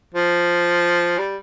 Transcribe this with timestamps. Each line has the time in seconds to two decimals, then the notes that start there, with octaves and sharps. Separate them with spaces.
0.14 F3
1.18 G3